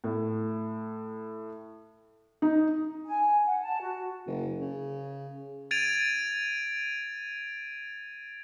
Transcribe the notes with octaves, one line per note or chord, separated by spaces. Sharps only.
A2
D#4
G#5
F#5
A5
F#4
F#1
C#3
G#6 A6 D7 D#7 F7